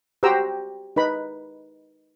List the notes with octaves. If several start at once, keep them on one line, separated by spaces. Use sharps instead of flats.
F#4 G4 C5 G5 A#5 E6
D#4 B4 B5